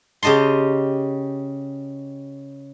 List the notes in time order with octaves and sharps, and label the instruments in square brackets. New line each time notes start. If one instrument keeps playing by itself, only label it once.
[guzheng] C#3 G4 D#5 A5 C6